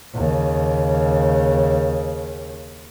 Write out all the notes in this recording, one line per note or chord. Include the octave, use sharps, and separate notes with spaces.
D#2 C#3